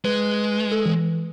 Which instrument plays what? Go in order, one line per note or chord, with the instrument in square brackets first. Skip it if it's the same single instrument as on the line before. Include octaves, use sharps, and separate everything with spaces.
[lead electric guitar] G#3 [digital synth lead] B4
[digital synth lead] A4
E3